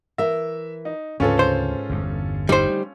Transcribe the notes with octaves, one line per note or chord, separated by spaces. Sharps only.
E3 A#4 E5
D#4
D2 G#2 C#3 C#4 F4 A4 B4
C5
G1 E2 G2
D3 G3 A3 D#4 C5